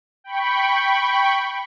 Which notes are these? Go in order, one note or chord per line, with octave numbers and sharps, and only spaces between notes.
G5 B5 C#6